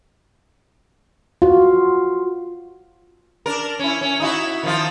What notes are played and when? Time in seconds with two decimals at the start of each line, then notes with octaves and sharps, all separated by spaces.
1.42 F4 F#4
3.46 D4 A#4
3.79 C#4 E4
4.01 C#4
4.20 D#4 E4 F#4
4.64 D#3 F3 F4